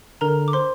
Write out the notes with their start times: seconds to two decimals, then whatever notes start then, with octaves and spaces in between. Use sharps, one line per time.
0.21 D3 A#4 A#5
0.48 D6
0.53 C5 C6